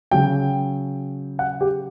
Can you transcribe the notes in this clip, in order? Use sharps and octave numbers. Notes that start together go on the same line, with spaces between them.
C#3 F#3 G5
F#5
G4